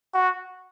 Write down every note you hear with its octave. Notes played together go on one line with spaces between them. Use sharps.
F#4